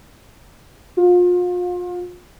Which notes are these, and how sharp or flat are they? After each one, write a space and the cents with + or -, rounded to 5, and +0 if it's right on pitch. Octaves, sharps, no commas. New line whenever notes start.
F4 +35